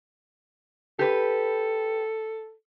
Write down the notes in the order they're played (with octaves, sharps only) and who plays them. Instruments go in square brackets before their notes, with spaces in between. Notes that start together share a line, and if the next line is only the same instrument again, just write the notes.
[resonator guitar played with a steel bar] G4 B4 [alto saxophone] A4